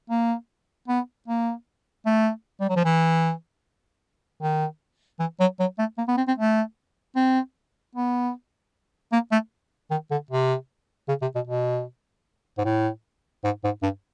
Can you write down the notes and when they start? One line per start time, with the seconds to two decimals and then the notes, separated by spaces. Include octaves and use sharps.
0.10 A#3
0.88 B3
1.28 A#3
2.06 A3
2.61 G3
2.69 F#3
2.76 F3
2.85 E3
4.42 D#3
5.19 E3
5.40 F#3
5.60 F#3
5.79 A3
5.98 A#3
6.08 B3
6.17 C4
6.28 C4
6.38 A3
7.16 C4
7.95 B3
9.12 A#3
9.32 A3
9.91 D#3
10.11 D3
10.31 C3
11.09 C#3
11.22 C3
11.35 B2
11.47 B2
12.58 G#2
12.65 A2
13.44 G#2
13.64 G#2
13.82 G2